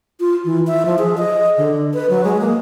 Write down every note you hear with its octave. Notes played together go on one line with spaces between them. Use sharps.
F4
E3
E5
F3
G#4
D#5
D3
B4
F#3
G#3
A#3